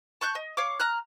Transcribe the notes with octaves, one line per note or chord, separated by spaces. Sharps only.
A5 C#6 F#6 G6
D#5
C#5 F5 C#6 D6
A#5 F6 F#6